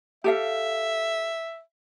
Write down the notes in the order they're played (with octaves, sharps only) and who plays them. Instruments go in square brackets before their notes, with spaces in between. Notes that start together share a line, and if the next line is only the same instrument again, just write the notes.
[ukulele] G4 A4 F5 [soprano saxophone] E5